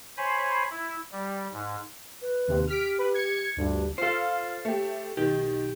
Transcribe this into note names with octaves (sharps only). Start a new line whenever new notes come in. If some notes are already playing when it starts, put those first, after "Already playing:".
C5 C#5 G#5 B5
E4
G3
G#2
B4
D#2 C3
G4 F6 B6 D7
B4
G#6 C#7
D2 G2 D4
F4 A4 C5 F5
A3 G4
B1 D#3 G4